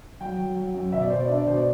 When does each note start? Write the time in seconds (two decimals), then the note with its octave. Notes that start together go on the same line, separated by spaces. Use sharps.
0.20 F#3 G5
0.38 F#3
0.56 F#3
0.74 F#2
0.92 B2 E5
1.02 D5
1.10 B2 C5
1.20 D5
1.28 D4 E5
1.38 D5
1.46 B2 C5
1.56 D5